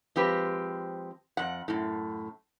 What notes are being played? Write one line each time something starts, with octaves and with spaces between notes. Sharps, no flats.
F3 G#3 C4 G4 B4
F2 F#5
F#2 A2